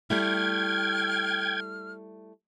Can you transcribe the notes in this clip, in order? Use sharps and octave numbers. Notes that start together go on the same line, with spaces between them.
G3 A3 E4 G5 F6 G#6